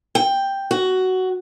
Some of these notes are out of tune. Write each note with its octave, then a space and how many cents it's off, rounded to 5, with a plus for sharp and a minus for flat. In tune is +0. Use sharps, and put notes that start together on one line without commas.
G5 +5
F#4 +10